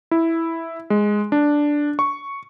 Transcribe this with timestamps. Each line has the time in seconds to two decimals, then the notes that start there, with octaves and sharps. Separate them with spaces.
0.11 E4
0.90 G#3
1.32 D4
1.99 C#6